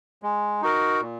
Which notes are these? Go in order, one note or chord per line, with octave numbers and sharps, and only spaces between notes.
G#3
D#4 F#4 A#4
A#2